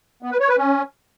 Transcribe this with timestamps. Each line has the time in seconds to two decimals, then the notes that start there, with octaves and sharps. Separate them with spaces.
0.23 B3
0.31 B4
0.40 C#5
0.49 B4
0.58 C#4